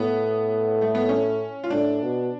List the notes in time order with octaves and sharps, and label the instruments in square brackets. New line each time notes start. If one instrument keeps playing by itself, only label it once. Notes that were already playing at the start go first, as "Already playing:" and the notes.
Already playing: [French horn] A2 [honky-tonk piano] B3
[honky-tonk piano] A3
B3
C#4
F4
[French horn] A2 [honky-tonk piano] D4
[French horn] B2